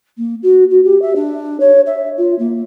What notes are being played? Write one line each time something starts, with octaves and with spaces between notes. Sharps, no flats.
A#3
F#4
F#4
G4
E5
D4
C#5
E5
F4
A#3